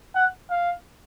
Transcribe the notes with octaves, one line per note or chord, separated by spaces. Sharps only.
F#5
F5